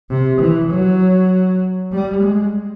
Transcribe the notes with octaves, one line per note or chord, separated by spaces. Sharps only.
C3
E3
F#3
G3
G#3